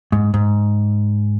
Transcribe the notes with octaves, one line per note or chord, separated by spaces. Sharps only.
G#2
G#2